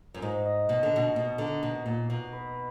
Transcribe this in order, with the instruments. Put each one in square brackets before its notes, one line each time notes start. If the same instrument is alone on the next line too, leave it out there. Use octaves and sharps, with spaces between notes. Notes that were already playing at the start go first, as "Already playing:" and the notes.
[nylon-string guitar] F#2
[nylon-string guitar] G#2 [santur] D#4
[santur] D#5
[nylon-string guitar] B2 [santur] D#5
[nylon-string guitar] D3
[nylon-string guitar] B2 [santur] F#4
[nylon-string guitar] B2 [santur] D#5
[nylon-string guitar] D3 [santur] A#4
[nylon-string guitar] B2 [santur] A#4
[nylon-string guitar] A#2 [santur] A#4
[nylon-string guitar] B2 [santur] A#3
[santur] B4